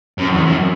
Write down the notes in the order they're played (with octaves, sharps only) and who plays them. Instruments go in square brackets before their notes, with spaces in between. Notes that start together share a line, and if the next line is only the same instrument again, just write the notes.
[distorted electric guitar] F#2
E2
F#2